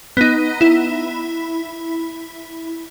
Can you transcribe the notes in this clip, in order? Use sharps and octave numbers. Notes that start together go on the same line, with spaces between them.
B3 D#4
E4